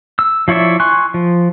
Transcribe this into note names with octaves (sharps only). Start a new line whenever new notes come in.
E6
F3 E4 C#5 D5 E5
G#5 C6 C#6 F#6
F3